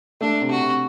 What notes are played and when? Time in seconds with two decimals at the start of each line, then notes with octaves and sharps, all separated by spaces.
0.21 A3 D4
0.41 C3
0.51 F#4
0.60 C3